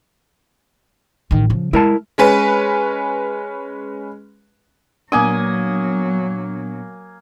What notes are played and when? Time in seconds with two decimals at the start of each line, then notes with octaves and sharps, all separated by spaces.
1.31 A1 D#3
1.50 C#3 F3
1.73 G#3 E4 A#4 A5
2.18 G#3 C#4 B4
5.12 A#2 F#3 A#3 B3 D4 G#5 D#6